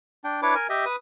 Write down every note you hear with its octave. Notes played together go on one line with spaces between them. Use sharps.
D4 G5
D4 E4 B4 C#5 D6
A#4 G#5
G4 D#5 E5
B4 D#6